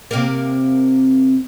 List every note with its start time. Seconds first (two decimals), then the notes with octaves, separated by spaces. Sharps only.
0.11 C3 A#3